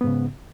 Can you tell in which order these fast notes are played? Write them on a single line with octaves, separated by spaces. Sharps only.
B3 G#2 C#3